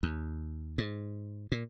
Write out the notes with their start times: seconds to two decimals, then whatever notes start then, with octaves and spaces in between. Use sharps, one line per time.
0.03 D#2
0.78 G#2
1.52 A#2